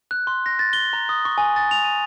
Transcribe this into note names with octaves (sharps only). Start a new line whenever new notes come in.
F#6
C6
A#6
A6
G7
A#5
D#6
C#6
G#5
A6
F7
D#7